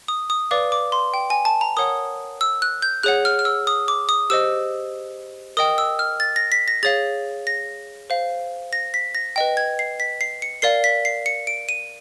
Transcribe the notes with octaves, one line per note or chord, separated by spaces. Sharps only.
D#6
D#6
B4 D5 F5 D6
D6
C6
G5
G#5
A5
A#5
A#4 C#5 F#5 D#6
E6
F#6
G6
G#4 C#5 F#5 F#6
F6
F6
E6
D#6
D6
D#6
G4 C5 D#5 E6
A#4 D#5 G5 D#6
E6
F6
A6
A#6
B6
A#6
G#4 C#5 F5 A6
A#6
C5 F5
A#6
B6
A#6
B4 D#5 G5
G#6
C7
B6
C7
C#7
A#4 D5 F5 C7
B6
C7
C#7
D7
D#7